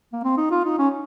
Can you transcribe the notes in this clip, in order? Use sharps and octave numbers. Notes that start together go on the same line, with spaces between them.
A#3
C4
D#4
F4
D#4
C#4